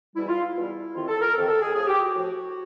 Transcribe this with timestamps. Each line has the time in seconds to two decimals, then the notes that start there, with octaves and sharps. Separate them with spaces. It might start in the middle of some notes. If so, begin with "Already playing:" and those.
0.16 E2 B2 G3 E4
0.29 F4
0.42 E4
0.55 E2 B2 G3
0.95 F2 C3 D#3 F4
1.08 A4
1.21 A#4
1.34 F2 C3 D#3 A4
1.47 A4
1.61 G#4
1.74 A2 F3 G#4
1.87 G4
2.00 F#4
2.14 A2 F3